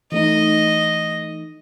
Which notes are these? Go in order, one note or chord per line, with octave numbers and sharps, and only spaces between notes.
E3 A3 D#4 D#5